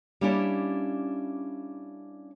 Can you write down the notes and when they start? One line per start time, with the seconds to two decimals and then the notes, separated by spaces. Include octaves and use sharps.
0.21 G3 A#3 C#4 D4 E4 D5